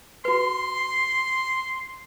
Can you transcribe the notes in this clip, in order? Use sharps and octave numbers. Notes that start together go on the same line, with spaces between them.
F#4 B4 C6